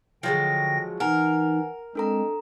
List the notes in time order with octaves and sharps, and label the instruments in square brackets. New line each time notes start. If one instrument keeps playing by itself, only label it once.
[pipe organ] D3 G5 A#6 [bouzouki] F3 F#3 G#3
[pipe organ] E3 D#4 [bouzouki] A#4 [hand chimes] F#5 G#5 F6
[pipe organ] G#3 C4 [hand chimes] D4 A4 A#5